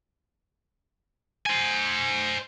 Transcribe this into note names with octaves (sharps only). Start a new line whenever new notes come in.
C5 G#5